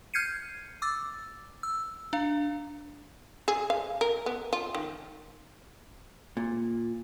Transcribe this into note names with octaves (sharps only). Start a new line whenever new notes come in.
F6 G6 G#6 C7 C#7 D#7
D6 E6 A6
E6
D4 F5
G#4
F5
A#4
B3
F4
D#3
A#2